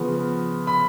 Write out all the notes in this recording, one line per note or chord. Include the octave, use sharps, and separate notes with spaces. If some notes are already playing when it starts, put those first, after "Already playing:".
Already playing: C#3 F3 B3
B5